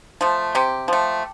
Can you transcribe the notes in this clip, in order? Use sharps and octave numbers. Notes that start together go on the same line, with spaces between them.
F3 A3
C3 G4
F3 A3